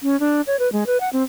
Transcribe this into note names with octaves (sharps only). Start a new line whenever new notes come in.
C#4
D4
C#5
B4
G#3
B4
F#5
C4